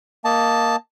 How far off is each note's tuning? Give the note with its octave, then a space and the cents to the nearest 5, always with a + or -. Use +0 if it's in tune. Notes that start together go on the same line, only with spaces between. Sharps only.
A#3 +0 D#5 +0 A5 +0